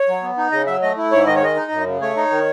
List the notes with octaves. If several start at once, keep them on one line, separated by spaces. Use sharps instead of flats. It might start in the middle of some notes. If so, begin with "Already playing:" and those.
Already playing: C#5
F#3
B3
D#4
C#3 D#5
F#3 E5
A3 D#5
E4
G#2 C#5
D#3 D#5
C#5
G#3 D#5
D#4
F#2
C#3
A3 C#5
D#4
D#3